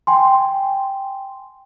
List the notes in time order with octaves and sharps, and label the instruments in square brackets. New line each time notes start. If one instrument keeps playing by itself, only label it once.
[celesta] G5 G#5 C6